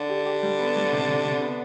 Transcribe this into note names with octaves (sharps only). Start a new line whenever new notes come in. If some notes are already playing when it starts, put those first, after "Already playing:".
Already playing: D3
G4
G4
G3
B3
G3
C3
C3
C3
B3